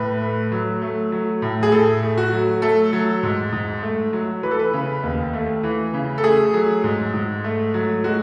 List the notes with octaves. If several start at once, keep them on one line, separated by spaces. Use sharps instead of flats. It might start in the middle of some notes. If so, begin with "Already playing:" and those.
Already playing: A2 B4
A3
F#3
A3
F#3
A2
G#4
A2 A4
A3
F#4
F#3
A3 A4
F#3
G#2
G#2
A3
F#3
E3 B4
A4
B4
C#3
D#2
A3
E3
C#3
A4
A3 G#4
F#3
G#2
G#2
A3
F#3
G#3 F#4